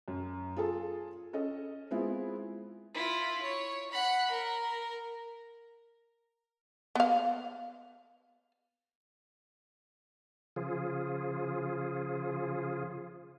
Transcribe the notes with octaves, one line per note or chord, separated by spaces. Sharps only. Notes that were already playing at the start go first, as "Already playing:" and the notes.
F#2
F4 G#4 A4 A5
C#4 A4 D#5
G#3 B3 C4 E4 F4
E4 F4
C#5
F#5 B5
A#4
B3 F5
C#3 F3 F4 G#4